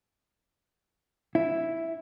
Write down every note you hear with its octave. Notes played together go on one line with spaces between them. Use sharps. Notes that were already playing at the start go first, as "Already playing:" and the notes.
E4